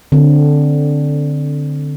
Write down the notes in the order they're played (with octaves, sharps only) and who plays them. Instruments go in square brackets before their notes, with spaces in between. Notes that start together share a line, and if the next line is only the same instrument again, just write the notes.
[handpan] D3 C4